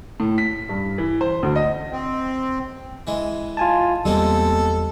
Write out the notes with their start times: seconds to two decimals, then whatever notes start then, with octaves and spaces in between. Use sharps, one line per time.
0.20 A2
0.38 B6
0.69 G2
0.98 E3
1.21 C5
1.43 D2
1.56 D#5
1.92 C4
3.07 E3 G#3
3.57 F4 G#5 A5
4.05 E2 G3 G#3 A#3 C4 A4